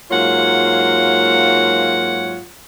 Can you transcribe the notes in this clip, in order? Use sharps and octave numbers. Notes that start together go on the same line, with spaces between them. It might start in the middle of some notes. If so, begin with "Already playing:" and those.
G#2 F#3 A#3 F4 C#5 F#5